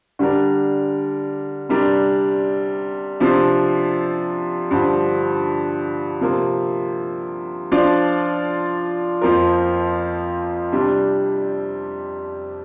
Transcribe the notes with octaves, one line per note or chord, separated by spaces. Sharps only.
D3 G3 D4 A#4
C3 G3 D4 A#4
C3 F3 D4
G2 D3 F3
C3 F3 A#3
F3 D4 F4 D5
F2 F3 A#3 F4 A#4
C3 G3 D4